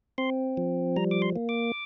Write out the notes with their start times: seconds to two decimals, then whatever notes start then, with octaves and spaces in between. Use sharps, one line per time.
0.18 C4 C6
0.57 F3
0.96 G3 A#5
1.11 D6
1.22 C6
1.36 A#3
1.49 D6